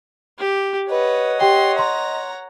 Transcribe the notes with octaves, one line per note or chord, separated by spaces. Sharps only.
G4
B4 C#5 D#5 F#5
G4 G5 C6
A#5 C6